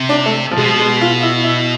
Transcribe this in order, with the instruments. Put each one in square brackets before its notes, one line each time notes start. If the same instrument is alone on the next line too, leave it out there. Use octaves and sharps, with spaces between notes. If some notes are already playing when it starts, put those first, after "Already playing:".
Already playing: [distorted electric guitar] C3
[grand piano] D4
A3
F3
[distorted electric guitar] B2 [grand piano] G#3
[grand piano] G#3
F4
E4
E4